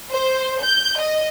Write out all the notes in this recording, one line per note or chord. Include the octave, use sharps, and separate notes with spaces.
C5
G6
D#5